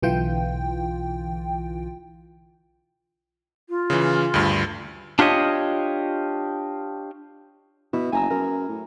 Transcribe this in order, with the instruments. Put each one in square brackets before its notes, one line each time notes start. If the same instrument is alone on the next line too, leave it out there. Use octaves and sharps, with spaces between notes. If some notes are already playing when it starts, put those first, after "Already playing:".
[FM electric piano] B1 D3 E3 F4 G5
[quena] F4
[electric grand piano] C#3 E3
D2 G2
[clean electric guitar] D4 F4 G4 C#5 D#5
[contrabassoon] B2 [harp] E4
[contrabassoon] F#1 [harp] G#5 A#5 E6
[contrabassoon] F#2 [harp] A#4
[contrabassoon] A2